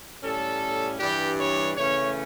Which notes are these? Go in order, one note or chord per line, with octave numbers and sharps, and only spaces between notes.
A2 G3 C#4 A4
G2 E3 G3 D4 G4
C#5
C#3 E3 A3 C#4 C#5